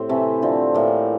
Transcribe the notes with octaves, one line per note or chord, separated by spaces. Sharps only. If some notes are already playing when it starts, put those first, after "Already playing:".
Already playing: A2 C4 G4
C3 E3 A3
D3 F3 C4
A2 E3 A#3